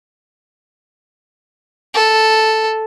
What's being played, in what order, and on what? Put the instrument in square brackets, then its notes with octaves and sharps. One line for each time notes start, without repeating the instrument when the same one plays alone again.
[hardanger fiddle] A4